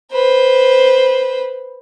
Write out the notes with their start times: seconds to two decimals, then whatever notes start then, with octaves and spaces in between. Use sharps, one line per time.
0.11 B4 C5